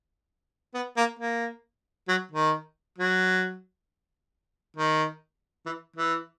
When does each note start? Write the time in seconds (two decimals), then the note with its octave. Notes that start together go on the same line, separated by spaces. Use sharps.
0.74 B3
0.97 A#3
1.19 A#3
2.08 F#3
2.31 D#3
2.98 F#3
4.76 D#3
5.66 E3
5.96 E3